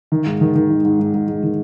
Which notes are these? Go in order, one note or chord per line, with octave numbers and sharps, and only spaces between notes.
D#3
G#2
D#3
D#3
G#2
G#2
G#2
G#2
G#2
D#3